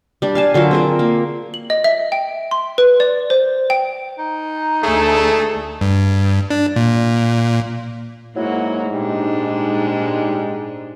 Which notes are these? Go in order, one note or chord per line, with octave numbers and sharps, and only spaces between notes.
G3 D4
F5 G#5 A5
D3 F#3 F4 A#4
C4 G#4 A#4
A#3
F#7
D#5
E5
G5
C6
B4
D5
C5
G5
D#4
D2 A3 G#4 A4
G2
D4
A#2
G#2 F#3 A#3 E4 F#4
A#2 G3 G#3 D4 D#4